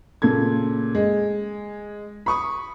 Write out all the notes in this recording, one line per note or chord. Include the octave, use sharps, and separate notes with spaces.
A#2 C#3 A4 G#6
G#3
B5 C#6 D#6